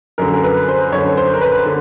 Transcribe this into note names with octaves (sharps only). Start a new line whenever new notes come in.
F#2 D3 A#4
A#4
B4
C5
F#2 D3 C#5
C5
A#4
B4
D3